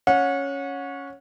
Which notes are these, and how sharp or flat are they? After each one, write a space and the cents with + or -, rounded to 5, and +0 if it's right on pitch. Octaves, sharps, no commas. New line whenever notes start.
C#4 +0 F#5 -30